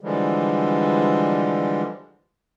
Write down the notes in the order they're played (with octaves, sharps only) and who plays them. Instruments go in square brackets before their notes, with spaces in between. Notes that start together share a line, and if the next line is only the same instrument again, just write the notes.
[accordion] D3 E3 F3 G3 G#3